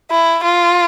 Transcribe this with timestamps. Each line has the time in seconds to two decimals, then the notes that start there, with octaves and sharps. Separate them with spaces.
0.11 E4
0.44 F4